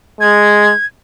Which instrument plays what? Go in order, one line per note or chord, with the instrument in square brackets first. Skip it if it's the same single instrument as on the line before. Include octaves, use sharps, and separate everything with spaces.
[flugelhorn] G#3 [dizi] G#6